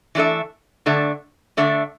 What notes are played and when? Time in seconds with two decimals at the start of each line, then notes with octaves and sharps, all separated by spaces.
0.15 E3 A3 D4 A4 E5
0.86 D3 A3 D4 A4 E5
1.57 D3 A3 D4 A4 E5